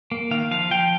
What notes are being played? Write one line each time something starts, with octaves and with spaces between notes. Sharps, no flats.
A#3
D#3 F5
F3 F5
F3 G5